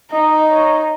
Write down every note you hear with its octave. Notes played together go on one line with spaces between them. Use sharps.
D#4 D#5
C#5